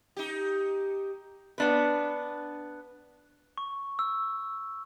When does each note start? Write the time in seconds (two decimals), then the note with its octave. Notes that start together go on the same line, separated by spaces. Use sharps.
0.17 D#4 G4
1.58 B3 D4 B4
3.58 C#6
3.99 E6